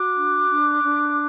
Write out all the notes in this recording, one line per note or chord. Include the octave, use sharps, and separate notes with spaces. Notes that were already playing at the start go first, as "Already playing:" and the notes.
Already playing: F#4 D6 F#6
D4
D4
D4